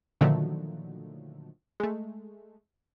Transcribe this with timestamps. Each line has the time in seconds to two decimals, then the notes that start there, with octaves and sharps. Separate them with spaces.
0.21 A#2 D3 D#3 F3 F#3 A3
1.80 G#3 A3